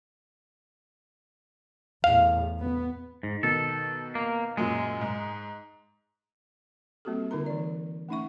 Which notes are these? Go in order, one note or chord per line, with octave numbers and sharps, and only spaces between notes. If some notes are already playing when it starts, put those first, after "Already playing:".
E2 A2 F5
B3
G#2
B2 D#3 A4
A#3
F#2 A#2 F#3 G#3
G#2
G3 A#3 C4 F#4 G4 A4
D3 D#4 F4 A#4 A#5 C6
E3 D5
A3 C#4 D#4 E5 F#5 C#6